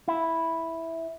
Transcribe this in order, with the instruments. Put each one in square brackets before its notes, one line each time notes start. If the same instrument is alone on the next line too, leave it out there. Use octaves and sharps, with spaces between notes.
[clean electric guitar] E4